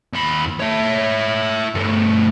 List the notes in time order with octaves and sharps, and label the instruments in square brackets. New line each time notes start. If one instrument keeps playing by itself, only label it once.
[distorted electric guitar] D#2 B5
E4 C#5
G2 A3